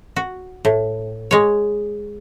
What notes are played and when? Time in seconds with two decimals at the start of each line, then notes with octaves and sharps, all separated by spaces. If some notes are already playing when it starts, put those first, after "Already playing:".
0.16 F#4
0.65 A2
1.31 G#3 C#5